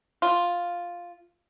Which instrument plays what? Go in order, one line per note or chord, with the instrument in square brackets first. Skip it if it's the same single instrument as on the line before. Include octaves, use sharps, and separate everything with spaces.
[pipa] F4